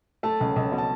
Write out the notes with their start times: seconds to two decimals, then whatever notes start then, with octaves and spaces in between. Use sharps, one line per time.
0.23 A3 A5
0.40 C#2
0.56 C#2
0.72 B2
0.78 A5